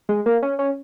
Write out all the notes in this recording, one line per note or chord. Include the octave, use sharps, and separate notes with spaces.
G#3
A#3
C#4
C#4